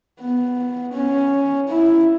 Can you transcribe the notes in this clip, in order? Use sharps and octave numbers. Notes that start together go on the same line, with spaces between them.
B3
C#4
E4